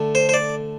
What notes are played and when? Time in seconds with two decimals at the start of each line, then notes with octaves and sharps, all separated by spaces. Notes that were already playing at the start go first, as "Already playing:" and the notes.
Already playing: D3 A3
0.15 C5
0.29 C5
0.34 D5